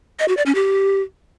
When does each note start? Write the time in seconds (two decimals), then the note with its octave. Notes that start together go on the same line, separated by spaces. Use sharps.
0.19 D#5
0.28 F#4
0.37 D5
0.46 C#4
0.55 G4